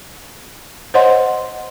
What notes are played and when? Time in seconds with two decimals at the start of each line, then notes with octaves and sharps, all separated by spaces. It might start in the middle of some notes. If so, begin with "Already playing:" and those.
0.94 C5 C#5 D#5 F#5 C6